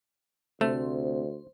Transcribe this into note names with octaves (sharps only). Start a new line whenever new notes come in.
D2 C3 A3 C5